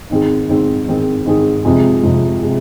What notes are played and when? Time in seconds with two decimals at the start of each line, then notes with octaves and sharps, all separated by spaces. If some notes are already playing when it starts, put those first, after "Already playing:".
0.10 G#2 D#3 C4 G#4
0.49 G#2 D#3 C4 G#4
0.87 G#2 D#3 C4 G#4
1.26 G#2 D#3 C4 G#4
1.65 F2 C3 G#3 F4 G#4
2.03 F2 C3 G#3 F4 G#4
2.42 C3 G#3 F4 G#4